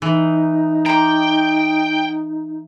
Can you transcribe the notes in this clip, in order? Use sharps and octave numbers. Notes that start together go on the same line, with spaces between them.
E3 D#4
G5 A#5 C6 D6